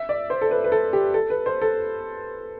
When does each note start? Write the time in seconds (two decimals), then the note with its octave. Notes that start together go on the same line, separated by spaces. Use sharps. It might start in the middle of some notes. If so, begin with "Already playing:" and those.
Already playing: E5
0.09 D5
0.30 C5
0.41 A4
0.51 B4
0.64 B4
0.72 A4
0.93 G4
1.14 A4
1.30 B4
1.46 C5
1.61 A4